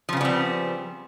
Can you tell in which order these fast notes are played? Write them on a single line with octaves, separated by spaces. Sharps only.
F3 C#3 B3 G3 C4